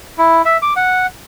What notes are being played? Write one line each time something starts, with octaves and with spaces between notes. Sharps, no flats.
E4
E5
D6
F#5